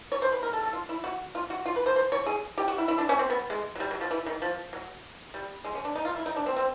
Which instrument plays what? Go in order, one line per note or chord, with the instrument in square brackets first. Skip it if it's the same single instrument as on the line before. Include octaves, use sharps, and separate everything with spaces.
[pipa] C#5
C5
B4
A#4
A4
A4
F4
E4
F#4
F4
F#4
F4
B4
C5
C5
C#5
G#4
G4
F#4
E4
E4
D4
C#4
C4
B3
G#3
F#3
G3
F#3
F3
E3
D#3
F3
F#3
G3
G#3
C#4
D4
D#4
F4
E4
D#4
D4
C4
C4